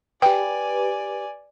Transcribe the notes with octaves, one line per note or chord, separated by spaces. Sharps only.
G4 B4 D5 G5 G#5